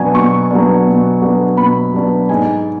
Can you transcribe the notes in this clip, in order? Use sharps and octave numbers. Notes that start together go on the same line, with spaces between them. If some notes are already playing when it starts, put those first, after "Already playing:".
Already playing: B2 F#3 B3 D4 G#5
B2 C#6
F#3 B3 D4
B2
F#3 B3 D4
B2 B5
F#3 B3 D4
G#2 G#5